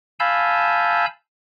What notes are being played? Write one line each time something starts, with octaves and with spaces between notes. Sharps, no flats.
F5 G#5 A5 B5 E6 G6